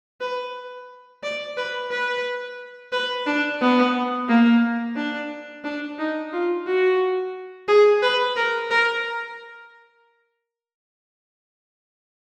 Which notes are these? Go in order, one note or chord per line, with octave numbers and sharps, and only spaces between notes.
B4
D5
B4
B4
B4
D4
B3
A#3
D4
D4
D#4
F4
F#4
G#4
B4
A#4
A#4